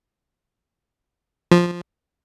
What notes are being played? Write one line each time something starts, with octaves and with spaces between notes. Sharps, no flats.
F3